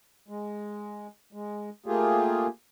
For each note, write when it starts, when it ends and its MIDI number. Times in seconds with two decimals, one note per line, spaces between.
0.28 1.07 56
1.33 1.69 56
1.86 2.47 57
1.86 2.47 58
1.86 2.47 65
1.86 2.47 67
1.86 2.47 68